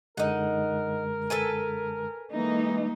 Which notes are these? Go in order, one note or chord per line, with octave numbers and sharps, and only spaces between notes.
F#2 D3 G#3 D#4 A#4 F#5
A4 B4 G#5
E3 G#3 A#3 D#4